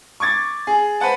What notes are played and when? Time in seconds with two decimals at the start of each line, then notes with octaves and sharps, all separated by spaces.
0.20 C#6 D6 G#6 A6
0.67 G#4
1.00 B4 C5 F#5 A5